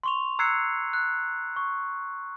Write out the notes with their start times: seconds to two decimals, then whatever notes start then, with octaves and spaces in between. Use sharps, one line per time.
0.03 C6 C#6 F7
0.39 A#5 E6 F#6 G#6 C7 C#7
0.93 F#6
1.56 C#6